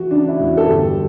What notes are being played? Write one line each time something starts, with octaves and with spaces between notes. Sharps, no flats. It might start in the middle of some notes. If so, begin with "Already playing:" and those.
Already playing: E3 F#4
C#3 D4
E4
E1 F#4
A4
G1 G4